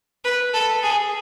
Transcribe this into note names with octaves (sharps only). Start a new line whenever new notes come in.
B4
A4
G#4